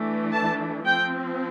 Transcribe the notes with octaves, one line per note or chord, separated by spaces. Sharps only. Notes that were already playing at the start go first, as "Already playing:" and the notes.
Already playing: E3 A3 D4
A5
F3 C4 G5